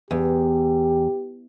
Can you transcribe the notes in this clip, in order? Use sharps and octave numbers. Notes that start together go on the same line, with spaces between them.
E2 G4